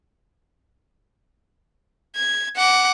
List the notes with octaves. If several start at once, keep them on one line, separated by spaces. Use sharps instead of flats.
G#6
F#5 D6